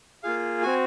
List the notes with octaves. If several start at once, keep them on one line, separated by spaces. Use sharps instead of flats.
A#3 F4 G#4 F5
C4 F#4 G#5